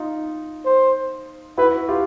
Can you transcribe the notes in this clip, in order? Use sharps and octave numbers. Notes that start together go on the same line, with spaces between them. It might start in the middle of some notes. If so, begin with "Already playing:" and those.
Already playing: D#4 F4
C5
E4 F#4 B4
F4 G4